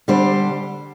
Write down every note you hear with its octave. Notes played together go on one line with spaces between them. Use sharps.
D3 G3 D4 G4 C5